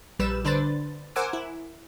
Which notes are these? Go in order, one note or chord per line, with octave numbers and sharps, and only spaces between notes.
A#1 G3 B4 E6 E7
D3 D4 B4 C5 A6
A#4 C5 F#5 G#5 D6 E6
E4